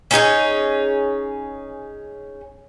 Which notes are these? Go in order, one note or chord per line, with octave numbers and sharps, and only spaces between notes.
C#4 D#4 G#4 C#5